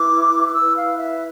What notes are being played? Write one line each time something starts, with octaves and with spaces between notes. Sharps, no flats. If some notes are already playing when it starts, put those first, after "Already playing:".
Already playing: E4 B4 D6
D6
E4 E6
B4
F5
E5